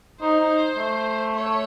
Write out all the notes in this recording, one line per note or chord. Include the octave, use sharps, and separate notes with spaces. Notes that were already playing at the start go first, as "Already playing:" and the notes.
D#4 C5
D#4
A3
C#5